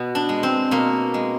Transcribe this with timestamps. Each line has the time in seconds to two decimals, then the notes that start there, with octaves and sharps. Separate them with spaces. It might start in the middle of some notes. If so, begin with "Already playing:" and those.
Already playing: B2 B3
0.15 D4
0.29 G#3
0.43 C4
0.71 B2 A#3
1.14 G#3